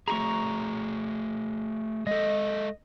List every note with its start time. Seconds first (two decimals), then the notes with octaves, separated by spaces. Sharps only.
0.08 A3 F#4 G#4 A#5 C#6
2.07 G#3 A4 D#5